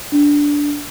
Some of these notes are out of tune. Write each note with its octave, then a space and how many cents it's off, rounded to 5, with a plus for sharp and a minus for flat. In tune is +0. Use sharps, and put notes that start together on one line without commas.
D4 -10